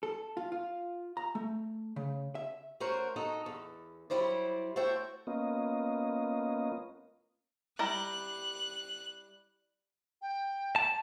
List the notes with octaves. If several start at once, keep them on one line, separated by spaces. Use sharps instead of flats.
A4
F4
F4
A#5
A3
C#3
E5
A3 C#4 F#4 A#4 C5
D#4 F#4 A4
E2
F#3 G3 E4 C5 D5
A3 F#4 C5 C#5 E5 G5
A#3 B3 C#4 F4 D#5
G3 E4 A#5 F#6
G5
A5